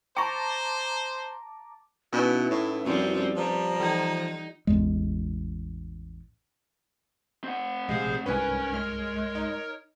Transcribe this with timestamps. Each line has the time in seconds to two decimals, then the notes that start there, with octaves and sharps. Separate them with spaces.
0.17 C5 G5 A5 A#5 C#6 D6
2.13 B2 C#4 D#4 E4 B4
2.50 A2
2.85 F#2 F3 G3 C4
3.36 F3 G3 A#5
3.80 E3 D#4 F4
4.67 A1 E2 G#3
7.44 C4 F#5
7.89 A#1 C3 G#3 G#4 C5 F5
8.26 C2 G#2 C#4 A#4 B4 C#5 G#5
8.74 G#3 F6
9.35 D#4